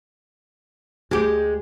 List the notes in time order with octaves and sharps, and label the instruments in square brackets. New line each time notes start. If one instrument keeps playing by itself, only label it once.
[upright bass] D2 [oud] G#3 G4